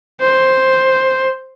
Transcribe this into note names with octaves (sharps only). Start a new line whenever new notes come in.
C5